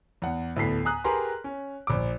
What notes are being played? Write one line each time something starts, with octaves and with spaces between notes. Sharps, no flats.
E2 F#5
D2 A2 B3 A4 B6 C7
G#5 A#5 D#6 F#6
G4 G#4 A#4 B4 A#5 C6
C#4
A#1 D6